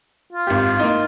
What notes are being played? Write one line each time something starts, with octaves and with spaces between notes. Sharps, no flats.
F4
G#1 G4
A#3 D#4